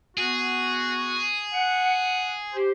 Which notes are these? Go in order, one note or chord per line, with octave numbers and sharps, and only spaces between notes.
B3 F#4 G#4
F#5
G4 C5